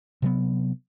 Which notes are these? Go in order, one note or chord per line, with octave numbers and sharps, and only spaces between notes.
C3 F#3 B3